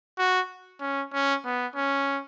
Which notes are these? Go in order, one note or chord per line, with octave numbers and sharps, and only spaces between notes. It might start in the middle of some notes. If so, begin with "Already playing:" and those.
F#4
C#4
C#4
B3
C#4